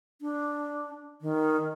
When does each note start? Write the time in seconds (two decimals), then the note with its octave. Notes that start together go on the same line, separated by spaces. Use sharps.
0.21 D4
1.21 D#3